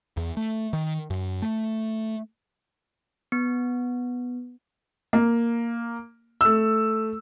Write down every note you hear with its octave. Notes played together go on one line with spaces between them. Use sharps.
E2
A3
D#3
F#2
A3
B3
A#3
A3 E6